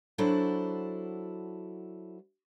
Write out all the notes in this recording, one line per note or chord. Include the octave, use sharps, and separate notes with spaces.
F#3 D4 E4 F#4 A4 C5